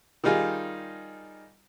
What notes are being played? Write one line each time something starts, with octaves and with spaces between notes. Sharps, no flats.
D#3 G3 D#4 F4 G#4